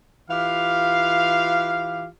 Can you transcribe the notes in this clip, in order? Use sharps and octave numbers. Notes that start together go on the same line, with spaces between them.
E3 F4 G4 F5